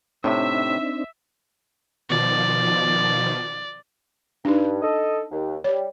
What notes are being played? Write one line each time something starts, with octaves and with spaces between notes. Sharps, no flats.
A2 C3 C4 D4 D#4 E5
B2 D#3 F3 D5
G2 D4 D#4
A4 D#5
D#2
G3 C#5